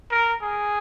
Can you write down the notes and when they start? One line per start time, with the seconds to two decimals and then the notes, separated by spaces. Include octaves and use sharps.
0.11 A#4
0.42 G#4